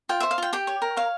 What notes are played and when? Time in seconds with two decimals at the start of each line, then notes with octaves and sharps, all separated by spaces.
0.09 F4 G5
0.20 C5 E5
0.31 F5
0.38 F4 G5
0.53 G4 G5
0.67 C#5
0.82 A#4
0.96 C#5 F5